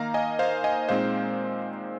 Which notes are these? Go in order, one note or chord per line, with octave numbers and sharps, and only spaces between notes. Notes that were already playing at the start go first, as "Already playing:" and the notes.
Already playing: D#3 A#3 D#4 F5 A#5
D#5 G#5
C5 F5
D#5 G#5
A#2 G#3 C4 D#4 C5 F5